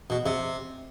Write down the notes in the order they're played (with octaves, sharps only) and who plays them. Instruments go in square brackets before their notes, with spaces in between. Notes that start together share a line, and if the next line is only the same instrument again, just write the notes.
[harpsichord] B2
C3